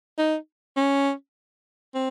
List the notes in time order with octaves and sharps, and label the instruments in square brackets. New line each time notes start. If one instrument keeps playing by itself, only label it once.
[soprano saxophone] D#4
C#4
C4